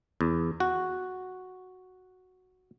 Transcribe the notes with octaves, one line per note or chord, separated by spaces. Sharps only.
E2
F#4